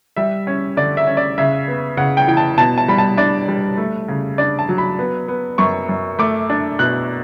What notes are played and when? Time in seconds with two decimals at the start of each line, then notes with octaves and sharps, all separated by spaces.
0.16 G3 E5
0.47 C#4
0.77 D3 D5
0.97 E5
1.07 C#4
1.17 D5
1.38 C#3 E5
1.68 B3
1.97 C#3 F#5
2.17 G5
2.28 E3 G5
2.37 A5
2.58 B2 A5
2.78 A5
2.88 G3 B5
2.98 A5
3.17 D4 D5
3.48 G3
3.77 A3
4.08 C#3
4.38 D4 D5
4.59 A5
4.69 F#3
4.78 B5
4.99 B3
5.28 B3
5.58 F#2 C#6
5.89 F#2
6.19 A3 D6
6.50 D4
6.79 B2 F#6